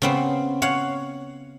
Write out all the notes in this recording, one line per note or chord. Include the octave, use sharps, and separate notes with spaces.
C#3 B3 C4
C#5 F5 F#5